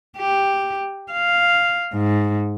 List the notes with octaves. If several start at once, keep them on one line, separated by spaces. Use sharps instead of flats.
G4
F5
G#2